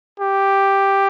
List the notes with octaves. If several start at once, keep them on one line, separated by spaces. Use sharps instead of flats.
G4